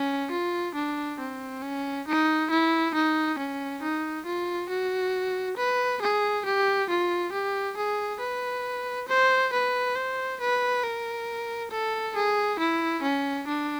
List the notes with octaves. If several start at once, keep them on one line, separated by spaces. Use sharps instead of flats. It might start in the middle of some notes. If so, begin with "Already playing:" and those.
Already playing: C#4
F4
D4
C4
C#4
D#4
E4
D#4
C#4
D#4
F4
F#4
B4
G#4
G4
F4
G4
G#4
B4
C5
B4
C5
B4
A#4
A4
G#4
E4
C#4
D4